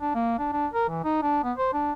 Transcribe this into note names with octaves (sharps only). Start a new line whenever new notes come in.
D4
A#3
D4
D4
A#4
E3
D#4
D4
B3
C5
D4